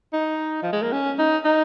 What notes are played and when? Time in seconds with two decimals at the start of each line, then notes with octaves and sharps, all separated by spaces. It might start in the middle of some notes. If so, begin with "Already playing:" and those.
0.13 D#4
0.63 F3
0.73 G#3
0.82 A#3
0.92 C#4
1.19 D#4
1.45 D#4